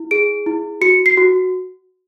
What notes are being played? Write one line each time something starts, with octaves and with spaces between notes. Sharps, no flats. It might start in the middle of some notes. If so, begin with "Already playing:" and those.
Already playing: E4
G#4 D7
E4
F#4 C#7
C7
F#4